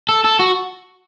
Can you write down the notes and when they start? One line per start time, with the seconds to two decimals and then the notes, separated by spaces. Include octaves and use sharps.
0.09 A4
0.24 A4
0.39 F#4